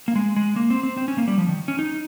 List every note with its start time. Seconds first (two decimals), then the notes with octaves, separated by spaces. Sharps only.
0.08 A#3
0.16 G#3
0.36 G#3
0.56 A#3
0.70 C4
0.83 C4
0.97 C4
1.08 C#4
1.18 A#3
1.28 G3
1.38 F3
1.48 D#3
1.68 C#4
1.79 D#4